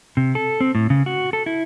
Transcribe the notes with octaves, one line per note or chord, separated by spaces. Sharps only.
C3
A4
C4
A2
C#3
F#4
A4
E4